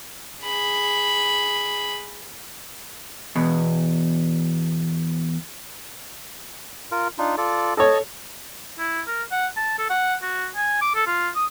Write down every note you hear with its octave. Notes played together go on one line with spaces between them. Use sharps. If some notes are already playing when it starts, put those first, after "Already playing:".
G#4 B5
E2 B2
F4 A#4
D4 D#4 F4
F4 A4 D5
A4 C#5 D#5 A5
E4
A#4
F#5
A5
A4
F#5
F#4
G#5
D6
A4
F4
D#6